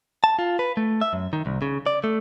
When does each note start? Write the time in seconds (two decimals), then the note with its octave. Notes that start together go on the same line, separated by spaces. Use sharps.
0.24 A5
0.39 F4
0.59 B4
0.77 A3
1.01 E5
1.13 F#2
1.33 D#3
1.46 C2
1.62 C#3
1.86 D5
2.04 A3